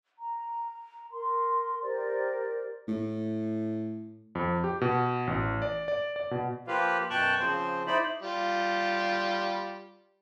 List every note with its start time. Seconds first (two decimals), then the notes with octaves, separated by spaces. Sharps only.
0.19 A#5
1.11 A#4 C6
1.82 G4 A#4 C5 D5
2.88 A2
4.35 F2
4.64 G4
4.81 B2
5.27 A1
5.62 D5
5.88 D5
6.16 D5
6.31 B2
6.67 F3 A#3 F4 G4 B4 F5
7.10 F#2 B2 G5 A5 C#6 F#6
7.39 C#3 F3 C4 C5
7.87 D#4 E4 C5 D5 B5
8.22 G3 F4